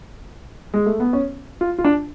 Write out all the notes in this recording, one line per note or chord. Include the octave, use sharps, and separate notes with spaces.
G#3
A3
B3
C#4
F4
F4
D4